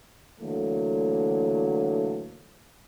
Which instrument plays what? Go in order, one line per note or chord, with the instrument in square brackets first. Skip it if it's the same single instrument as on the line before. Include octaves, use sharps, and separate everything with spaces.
[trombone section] D3 E3 F#3 A3 A#3